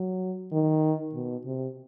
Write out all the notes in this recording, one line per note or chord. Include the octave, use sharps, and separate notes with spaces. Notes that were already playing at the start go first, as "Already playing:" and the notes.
Already playing: F#3
D#3
B2
C3